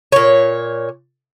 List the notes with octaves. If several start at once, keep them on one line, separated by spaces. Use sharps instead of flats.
A#2 C#5